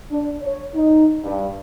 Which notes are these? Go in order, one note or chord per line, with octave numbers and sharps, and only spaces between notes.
D4
C#5
D#4
G2